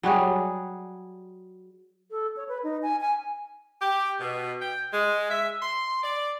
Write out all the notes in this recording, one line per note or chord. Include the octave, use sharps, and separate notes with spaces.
F#3 G3 F#4 G#4
A4
C#5
B4
D#4
G#5
G#5
G4
B2
G5
G#3
E5
C6
D5